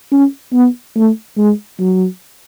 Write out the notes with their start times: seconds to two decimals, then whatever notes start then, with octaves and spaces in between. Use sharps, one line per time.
0.12 C#4
0.53 B3
0.96 A3
1.38 G#3
1.80 F#3